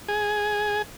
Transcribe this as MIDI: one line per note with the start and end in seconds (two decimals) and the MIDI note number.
0.08 0.82 68